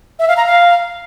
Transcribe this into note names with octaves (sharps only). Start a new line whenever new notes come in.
E5
F5
A#5
F5